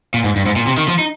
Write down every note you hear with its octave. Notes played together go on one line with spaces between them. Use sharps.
A#2
G#2
G2
G#2
A#2
C3
D#3
F3
D#4